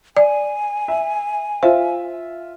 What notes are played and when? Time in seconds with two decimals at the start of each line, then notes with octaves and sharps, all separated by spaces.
0.17 D5 G#5
0.88 E5
1.63 F4 C5 E5